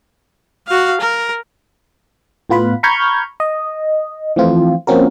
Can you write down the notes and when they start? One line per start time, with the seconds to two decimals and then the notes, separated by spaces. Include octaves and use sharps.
0.67 F#4 F5
1.01 A#4
2.50 A2 B3 F4 B4 B5
2.83 A#5 B5 C#6 F6 G6 G#6
3.40 D#5
4.36 E3 F3 A3 C4 F4
4.87 F3 A#3 C4 C#4 F#4 A#4